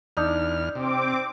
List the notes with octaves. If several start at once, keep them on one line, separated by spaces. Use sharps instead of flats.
E2 D4 D#4 F6
C3 C4 D6